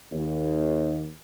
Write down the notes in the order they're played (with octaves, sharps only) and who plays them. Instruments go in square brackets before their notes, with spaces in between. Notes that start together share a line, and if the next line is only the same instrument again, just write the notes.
[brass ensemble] D#2